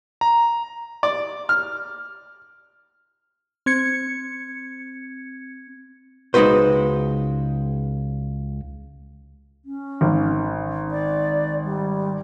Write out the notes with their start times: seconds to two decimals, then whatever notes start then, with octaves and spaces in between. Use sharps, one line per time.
0.21 A#5
1.03 D5
1.49 F6
3.66 C4 G#6 C#7
6.34 C#2 G#3 D#4 F#4 B4 C5
9.65 C#4
10.01 G#1
10.91 D5
11.65 G3